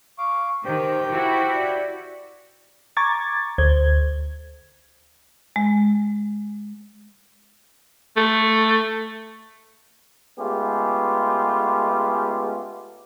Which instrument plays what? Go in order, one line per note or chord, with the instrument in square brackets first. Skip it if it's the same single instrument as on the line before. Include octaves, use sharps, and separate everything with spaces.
[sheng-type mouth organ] F5 D6 [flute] C#6
[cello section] D#3 [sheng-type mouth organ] G4 G5 [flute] C5
[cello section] E4 F#4 [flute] C5
[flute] D5
[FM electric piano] A#5 C#6 D6 G#6 A6
D2 C5 G#6
[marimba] G#3
[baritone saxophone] A3
[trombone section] G#3 A3 B3 C#4 F4 G4